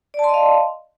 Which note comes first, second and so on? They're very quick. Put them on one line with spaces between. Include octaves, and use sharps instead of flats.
D5 A5 C6 D#5 F5